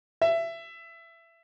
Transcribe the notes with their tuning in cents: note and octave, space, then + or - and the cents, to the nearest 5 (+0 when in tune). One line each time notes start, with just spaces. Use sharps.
E5 +20